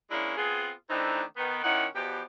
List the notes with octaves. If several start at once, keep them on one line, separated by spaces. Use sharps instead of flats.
G#3 A#3 C#4 D4 E4
B3 C4 F4 G#4
D#3 E3 A3 C4 D4 D#4
D#3 B3
A#2 D#3 C#4 D#4 E4 F#5
E2 B2 F3 G4